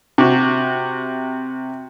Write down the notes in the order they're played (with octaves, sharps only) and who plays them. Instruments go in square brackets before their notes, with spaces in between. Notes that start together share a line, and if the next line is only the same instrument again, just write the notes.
[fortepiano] C3 F#4